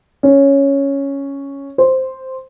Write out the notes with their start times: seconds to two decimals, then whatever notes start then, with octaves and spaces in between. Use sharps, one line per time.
0.23 C#4
1.78 C5